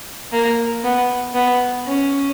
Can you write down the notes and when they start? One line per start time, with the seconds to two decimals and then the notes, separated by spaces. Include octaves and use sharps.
0.32 A#3
0.84 B3
1.35 B3
1.86 C#4